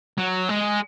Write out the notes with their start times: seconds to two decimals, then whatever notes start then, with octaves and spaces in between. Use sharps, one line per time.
0.18 F#3
0.49 G#3